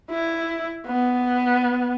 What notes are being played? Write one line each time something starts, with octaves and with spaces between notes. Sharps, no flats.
E4
B3